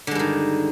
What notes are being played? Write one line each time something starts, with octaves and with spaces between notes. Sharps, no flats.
G2 D3 D#3 G#3